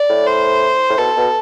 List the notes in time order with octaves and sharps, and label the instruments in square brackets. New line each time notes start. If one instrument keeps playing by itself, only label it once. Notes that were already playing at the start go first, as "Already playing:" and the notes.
Already playing: [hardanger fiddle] D5
[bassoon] A2
[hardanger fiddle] C5
[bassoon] A2
[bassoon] B2 [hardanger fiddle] A4
[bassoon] B2